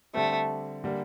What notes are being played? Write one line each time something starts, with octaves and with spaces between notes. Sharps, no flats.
D3 G3 A3 C4
D3 G3 A#3